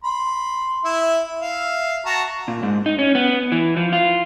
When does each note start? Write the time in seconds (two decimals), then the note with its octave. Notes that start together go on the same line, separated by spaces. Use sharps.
0.04 B5 C6
0.84 E4 E5
1.41 E5 F5
2.06 F#4 A5 A#5
2.48 A#2
2.63 G#2
2.86 D#4
2.99 C#4
3.15 B3
3.52 E3
3.77 F3
3.93 F4